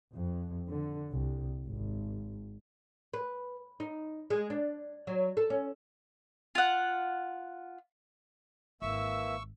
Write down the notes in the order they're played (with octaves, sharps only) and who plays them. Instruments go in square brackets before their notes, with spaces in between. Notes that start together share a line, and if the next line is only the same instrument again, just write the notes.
[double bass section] F2
D3
C2
G#1
[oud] B4
D#4
G#3
D4
F#3
A4
C#4
[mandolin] F4 F#5
[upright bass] G#1 [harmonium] E3 A#3 [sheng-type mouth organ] E5 [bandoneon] C#6 E6